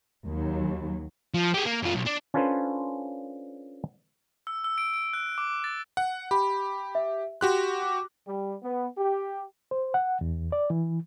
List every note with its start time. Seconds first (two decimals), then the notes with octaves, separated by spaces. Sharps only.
0.25 D#2 F#3
1.34 F3
1.54 G4 G#4
1.65 A#3
1.83 F#2 F4
1.96 B1
2.07 D4
2.34 C#4 D4 F4 A4 B4 C5
4.47 E6
4.64 E6
4.78 D7
4.94 D7
5.13 F#6
5.38 D6
5.64 A6
5.97 F#5
6.31 G4 B5
6.95 E5
7.41 F#4 G4 C6 F#6
7.82 D6
8.26 G3
8.63 B3
8.96 G4
9.71 C5
9.94 F#5
10.21 E2
10.52 D5
10.70 E3